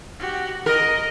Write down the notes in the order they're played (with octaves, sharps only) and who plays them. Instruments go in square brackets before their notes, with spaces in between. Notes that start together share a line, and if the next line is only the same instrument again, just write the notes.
[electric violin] F#4 G4
[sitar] A#4 [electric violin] D#5